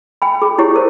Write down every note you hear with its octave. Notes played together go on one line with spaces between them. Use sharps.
G5 G#5 B5
G#4
E4 G4 C#5
G#4 A#4 C5